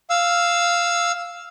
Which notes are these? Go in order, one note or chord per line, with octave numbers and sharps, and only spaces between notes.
F5 E6